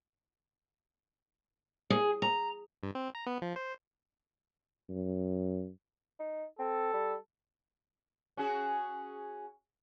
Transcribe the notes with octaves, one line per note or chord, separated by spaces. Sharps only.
G#4
A#5
G2
C4
A#5
B3
F3
C5
F#2
D#4
C4 A4
G3
C#4 F#4 G#4